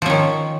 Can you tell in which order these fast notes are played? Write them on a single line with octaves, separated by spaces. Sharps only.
F3 C#4 D#3